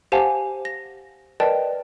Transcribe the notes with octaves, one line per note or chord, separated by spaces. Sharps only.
G4 C5 F5 F#5 G#5 A5
A#6
A#4 B4 D5 D#5 G5 A5